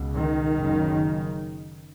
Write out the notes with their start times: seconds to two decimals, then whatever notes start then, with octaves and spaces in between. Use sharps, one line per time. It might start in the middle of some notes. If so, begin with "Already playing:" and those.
Already playing: C#2 B2
0.14 D#3
0.56 F#1 F#2 C#3